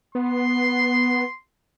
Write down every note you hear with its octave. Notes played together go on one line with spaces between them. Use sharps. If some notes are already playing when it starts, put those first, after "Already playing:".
B3 C6